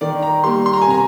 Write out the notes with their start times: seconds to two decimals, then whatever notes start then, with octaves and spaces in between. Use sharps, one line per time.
0.01 D#3 D5
0.22 A#5
0.44 G3 A#3 C6
0.66 C6
0.73 A#5
0.82 G#5
0.87 C3 A#5